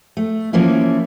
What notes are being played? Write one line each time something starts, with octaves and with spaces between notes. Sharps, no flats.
A3
E3 F3 A#3 C#4 E4